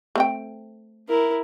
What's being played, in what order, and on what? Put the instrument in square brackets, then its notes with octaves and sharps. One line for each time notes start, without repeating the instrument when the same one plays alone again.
[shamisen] A3 C4 G5
[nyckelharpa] E4 A#4